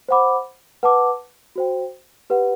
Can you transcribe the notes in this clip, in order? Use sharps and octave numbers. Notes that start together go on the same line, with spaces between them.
C5 F#5 B5 D6
B4 F#5 A5 D6
F#4 C5 G5
G4 B4 F#5